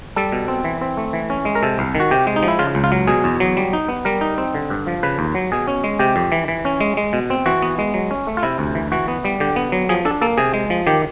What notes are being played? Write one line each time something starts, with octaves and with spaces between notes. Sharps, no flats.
G3 A4
B2
C4
E3
C4
A3
E3
C#4
G#3
A#4
C3 A4
C2
D#3
F#4
C3 G4
G#3
D#4
F3
E4
C#3 F4
C#2
F4
F#3
B2 G#4
E2
F#3
G3
D#4
B3
G3 A#4
D#4
C4
D3
G2
F3
C#3 B4
D#2
F#3
B2 G#4
C#4
G#3
C3 G4
F2
E3
E3
C#4
G#3
G#3
B2
C4
E3 F#4
B3
G#3
F#3
C#4
A3
F4
C3 E4
D2
E3
E3 F#4
B3
G3
D3 G4
B3
F#3
F3 G#4
D4 A4
A#3 A4
C3 G#4
G#3
F3
D#3 G4